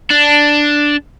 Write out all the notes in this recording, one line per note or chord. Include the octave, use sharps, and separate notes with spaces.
D4